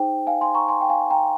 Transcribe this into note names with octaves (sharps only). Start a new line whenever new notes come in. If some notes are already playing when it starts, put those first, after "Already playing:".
Already playing: D#4 G#4 C5 G5
F5 G#5
G#5 C6
A#5 C#6
G#5 C6
G5
F5 G#5
G5 A#5